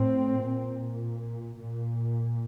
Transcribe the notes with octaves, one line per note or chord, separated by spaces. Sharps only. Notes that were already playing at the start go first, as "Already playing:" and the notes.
Already playing: A2 C4
A#2
A#2